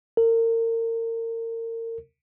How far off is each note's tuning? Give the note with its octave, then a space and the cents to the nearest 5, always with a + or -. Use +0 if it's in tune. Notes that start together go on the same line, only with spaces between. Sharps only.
A#4 -35